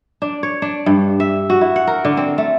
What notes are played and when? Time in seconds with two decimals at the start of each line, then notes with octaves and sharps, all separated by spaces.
0.22 D4
0.43 C#5
0.62 D4
0.86 G2
1.20 E5
1.50 F#4
1.61 E4
1.76 F#5
1.87 A#4
2.05 D3
2.17 C4
2.38 A3